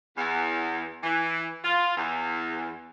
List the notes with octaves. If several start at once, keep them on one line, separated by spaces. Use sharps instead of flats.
E2
E3
F4
E2